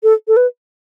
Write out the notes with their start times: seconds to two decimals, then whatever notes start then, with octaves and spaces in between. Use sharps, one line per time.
0.03 A4
0.28 A4
0.37 B4